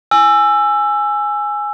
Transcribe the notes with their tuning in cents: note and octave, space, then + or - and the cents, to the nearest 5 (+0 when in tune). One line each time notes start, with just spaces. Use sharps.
G#5 +0 E6 +15